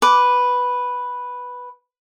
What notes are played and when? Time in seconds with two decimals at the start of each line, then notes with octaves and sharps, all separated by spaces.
0.02 B4 D6